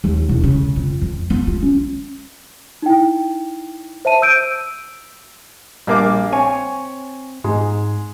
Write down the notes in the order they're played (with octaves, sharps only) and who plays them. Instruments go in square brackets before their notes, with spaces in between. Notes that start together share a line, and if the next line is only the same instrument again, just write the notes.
[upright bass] D#2
E1
C#3
F2
F2
B3
F4
C#4
[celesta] D#4 E4 G5
C5 E5 A5 D#7
E6 G6 D7 D#7
[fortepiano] A#1 A#3 D6 [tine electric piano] G3
[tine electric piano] C4 [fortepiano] C#5 G#5
[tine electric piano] G#2 [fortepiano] G#3